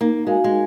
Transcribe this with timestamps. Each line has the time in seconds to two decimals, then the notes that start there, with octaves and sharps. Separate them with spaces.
0.01 A#3 D#4
0.27 G#3 F#4 A#4 F5 G#5
0.44 G#3
0.51 D#4